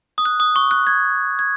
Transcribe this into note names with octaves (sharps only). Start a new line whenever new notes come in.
D#6
F#6
D#6
C#6
F#6
G#6
G#6